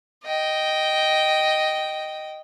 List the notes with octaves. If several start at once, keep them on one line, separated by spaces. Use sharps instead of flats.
D#5 G5